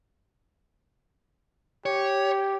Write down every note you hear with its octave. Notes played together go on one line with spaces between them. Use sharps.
G4 C#5